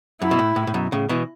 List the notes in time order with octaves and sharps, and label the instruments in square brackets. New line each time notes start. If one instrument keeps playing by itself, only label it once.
[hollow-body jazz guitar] F#2 [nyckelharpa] E4
[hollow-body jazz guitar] B2
A2
A2
A2
F#2 B2
A2 C#3
B2 E3